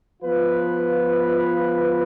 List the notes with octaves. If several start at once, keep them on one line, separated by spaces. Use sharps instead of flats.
F3 B3 F4 B4